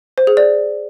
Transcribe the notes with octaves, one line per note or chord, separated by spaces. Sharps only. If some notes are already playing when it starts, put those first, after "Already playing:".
C5
G#4
D5